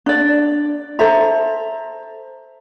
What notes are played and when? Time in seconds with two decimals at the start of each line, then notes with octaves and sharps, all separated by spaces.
0.06 D4 D5
0.99 A4 C5 E5 A#5